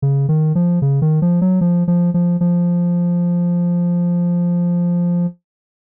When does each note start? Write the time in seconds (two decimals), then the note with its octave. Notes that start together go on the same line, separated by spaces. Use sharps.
0.02 C#3
0.29 D#3
0.55 F3
0.82 C#3
1.02 D#3
1.22 F3
1.41 F#3
1.61 F3
1.88 F3
2.14 F3
2.41 F3